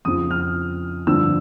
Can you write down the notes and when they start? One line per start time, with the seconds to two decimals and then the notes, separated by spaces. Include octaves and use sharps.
0.05 F2 C#3 F3 D#6
0.31 F6
1.07 G2 D3 F3 E6